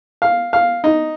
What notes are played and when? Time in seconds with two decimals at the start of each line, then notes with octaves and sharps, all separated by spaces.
0.22 F5
0.53 F5
0.84 D#4